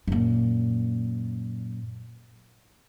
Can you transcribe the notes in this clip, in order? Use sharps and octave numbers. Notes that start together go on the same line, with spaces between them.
F#2 A#2